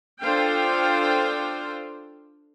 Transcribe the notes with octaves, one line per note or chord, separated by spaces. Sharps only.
D4 F4 A4 C5 F5 G5